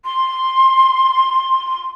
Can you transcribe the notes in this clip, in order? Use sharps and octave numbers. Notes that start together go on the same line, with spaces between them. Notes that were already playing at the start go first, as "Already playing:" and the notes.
C6